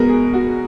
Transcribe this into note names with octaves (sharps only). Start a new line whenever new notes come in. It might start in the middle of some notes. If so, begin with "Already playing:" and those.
Already playing: B2 G#3 B3 A#4
G#4
F#4